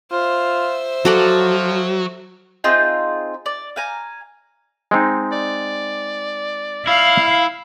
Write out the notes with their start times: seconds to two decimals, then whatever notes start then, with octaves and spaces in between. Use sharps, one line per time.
0.12 F4 C5 E5
1.05 F3 F#3 F#4 A4 D5
2.64 C4 D#4 F4 G#4
3.46 D5
3.76 F5 G#5 A#5
4.91 G#3 C4 D#4
5.32 D5
6.87 E4 F5